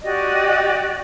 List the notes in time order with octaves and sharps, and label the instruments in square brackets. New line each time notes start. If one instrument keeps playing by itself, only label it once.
[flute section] F#4 G4 D5 D#5